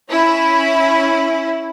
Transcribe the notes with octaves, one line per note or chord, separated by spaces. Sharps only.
C#4 E4